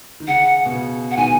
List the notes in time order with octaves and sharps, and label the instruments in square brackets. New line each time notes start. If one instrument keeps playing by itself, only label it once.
[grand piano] D#3
[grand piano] C#3 [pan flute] F#5
[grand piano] B2
C#3
[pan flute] F#5
[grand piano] B2 D#3 [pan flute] G#5